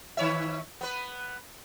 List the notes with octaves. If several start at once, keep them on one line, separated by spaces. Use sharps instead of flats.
D#3 C#5 E5
B3 B4